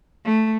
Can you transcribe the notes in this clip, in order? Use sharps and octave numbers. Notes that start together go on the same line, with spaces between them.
A3